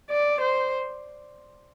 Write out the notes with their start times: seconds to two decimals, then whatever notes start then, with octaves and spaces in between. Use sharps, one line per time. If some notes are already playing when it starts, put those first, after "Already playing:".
0.10 D5
0.41 C5